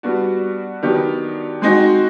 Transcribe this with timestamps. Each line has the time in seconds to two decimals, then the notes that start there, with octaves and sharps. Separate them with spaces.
0.03 G3 B3 D4 F#4
0.82 D#3 F#3 B3 D4 G4
1.62 G#3 C4 D#4 F#4